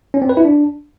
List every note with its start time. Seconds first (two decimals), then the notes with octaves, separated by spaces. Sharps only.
0.14 C#4
0.22 C4
0.29 B4
0.37 E4
0.45 D4